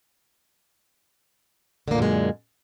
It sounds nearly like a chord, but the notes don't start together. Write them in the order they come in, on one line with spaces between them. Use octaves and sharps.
D3 A#3 A#2 F#2 G#3